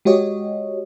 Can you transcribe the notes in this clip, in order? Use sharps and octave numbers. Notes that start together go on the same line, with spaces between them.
G#3 F#4 G4 C#5 D#5